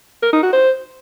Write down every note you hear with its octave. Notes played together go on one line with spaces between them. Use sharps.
A#4
D#4
F#4
C5